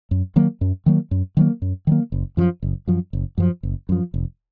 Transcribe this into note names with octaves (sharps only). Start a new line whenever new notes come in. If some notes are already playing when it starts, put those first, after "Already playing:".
F#2
D#3 F#3 A#3
F#2
D#3 F#3 A#3
F#2
D#3 F#3 A#3
F#2
D#3 F#3 A#3
F#1
F#2 F3
F#1
F#2 F3
F#1
F#2 F3
F#1
F#2 F3
F1